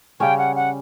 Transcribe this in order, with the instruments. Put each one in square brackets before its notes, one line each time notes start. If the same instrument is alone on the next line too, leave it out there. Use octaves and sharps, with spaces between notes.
[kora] C#3 G3 C#4 [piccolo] G5
[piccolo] F#5
F#5